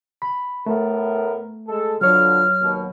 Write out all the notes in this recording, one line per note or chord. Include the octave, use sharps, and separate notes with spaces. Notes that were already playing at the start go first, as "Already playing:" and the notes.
B5
A2 A3 B3 A#4
G#3 A4
D3 F3 F#3 B3 C#5 F6
D#2 B2